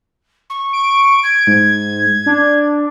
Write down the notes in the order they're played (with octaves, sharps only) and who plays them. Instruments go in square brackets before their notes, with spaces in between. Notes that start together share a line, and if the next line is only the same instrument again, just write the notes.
[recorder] C#6
[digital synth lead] D7
[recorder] G#6
[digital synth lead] G#2
D4